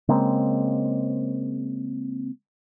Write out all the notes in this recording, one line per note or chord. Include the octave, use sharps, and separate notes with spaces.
C#3 G#3 A#3 C4